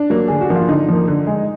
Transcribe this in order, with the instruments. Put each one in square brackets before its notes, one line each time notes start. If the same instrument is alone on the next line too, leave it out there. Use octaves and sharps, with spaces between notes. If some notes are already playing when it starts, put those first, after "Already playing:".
Already playing: [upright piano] D4
F#3 A#3
D3 G#4
F#4
F3 A#3
F4
D3 D#4
F3 A#3
D3
G#3